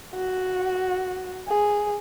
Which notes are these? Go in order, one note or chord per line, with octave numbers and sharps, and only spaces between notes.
F#4
G#4